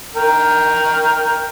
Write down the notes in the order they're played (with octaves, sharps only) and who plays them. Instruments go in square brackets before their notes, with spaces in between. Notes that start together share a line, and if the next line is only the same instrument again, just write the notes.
[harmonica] A#4 G5